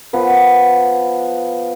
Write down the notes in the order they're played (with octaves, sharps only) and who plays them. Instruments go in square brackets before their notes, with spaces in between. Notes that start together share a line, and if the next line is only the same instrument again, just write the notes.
[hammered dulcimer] F3 B3 B4